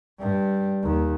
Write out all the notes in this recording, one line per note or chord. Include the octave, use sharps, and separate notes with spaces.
G2 G3
D#2